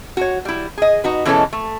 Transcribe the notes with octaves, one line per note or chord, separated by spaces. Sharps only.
F#4 C#5
G3 E4
G#4 D#5
D#4 F#4 B4
B2 E3 G#3 C#4 D4 A4
A3